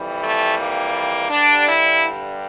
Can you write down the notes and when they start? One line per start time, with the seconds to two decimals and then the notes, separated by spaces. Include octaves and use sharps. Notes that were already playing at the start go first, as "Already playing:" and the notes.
Already playing: F2 E3 G3
0.22 A3
0.58 A#3
1.30 G2 D3 G3 D4
1.67 E4